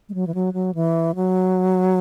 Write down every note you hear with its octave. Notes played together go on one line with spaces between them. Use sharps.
G#3
F#3
E3
F#3
F#3
E3
F#3